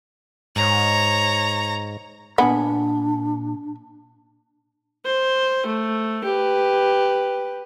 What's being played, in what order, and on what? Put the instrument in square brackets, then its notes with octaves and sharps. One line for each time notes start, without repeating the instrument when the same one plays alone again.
[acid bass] G#2 [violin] C#5 A#5
[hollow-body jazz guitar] A#2 G#5 B5 [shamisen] B3 [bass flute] D4
[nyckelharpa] C5
A3
G4 B4